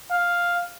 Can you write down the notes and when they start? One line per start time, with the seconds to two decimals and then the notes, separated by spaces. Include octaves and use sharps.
0.11 F5